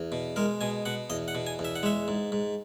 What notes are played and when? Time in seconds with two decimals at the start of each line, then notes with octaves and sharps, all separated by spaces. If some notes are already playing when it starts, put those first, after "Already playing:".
Already playing: E2
0.12 B2
0.36 G#3 A#4
0.61 B2 G#5
0.85 B2 F#5
1.10 E2 D#5
1.28 F#5
1.35 B2
1.47 G#5
1.59 E2
1.65 E5
1.76 F#5
1.83 G#3 E5
2.08 G#2
2.32 G#2